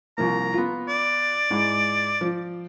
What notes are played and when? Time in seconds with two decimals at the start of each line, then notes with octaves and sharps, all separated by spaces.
0.18 C2 F3 A#3 A#5
0.54 B3 F4
0.88 D5
1.51 G#2 E4
2.21 F3